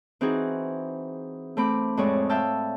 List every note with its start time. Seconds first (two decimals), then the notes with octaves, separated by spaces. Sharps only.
0.21 E3 C4 D#4 F#4 G#4
1.57 A3 C4 B5 D6
1.97 F2 A2 G#3 G#4 C#5 D5
2.29 E5 F5 G5 A5 E6